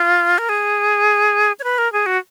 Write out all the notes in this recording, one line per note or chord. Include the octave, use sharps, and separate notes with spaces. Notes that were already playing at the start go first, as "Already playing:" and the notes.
Already playing: F4
A#4
G#4
C#5
B4
A#4
G#4
F#4